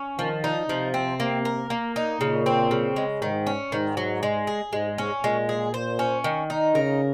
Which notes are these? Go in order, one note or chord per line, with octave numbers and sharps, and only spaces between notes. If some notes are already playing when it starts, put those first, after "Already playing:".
Already playing: C#4
D#3 F3
D#4
C3 F3
C4
A#3
A#4
A#3
D#4
A#2 C#3
C4
C#3
G#3
G#2 D#3
C#4
G#2 D#3
F#3
G#3
G#4
G#2 G#3
C#4
A#2 G#3
G#4
C5
C#4
D#3
D#4
C#3 A#4